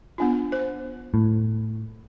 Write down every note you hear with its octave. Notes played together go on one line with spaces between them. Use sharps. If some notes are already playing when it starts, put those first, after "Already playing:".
B3 D4 F4
C5
A2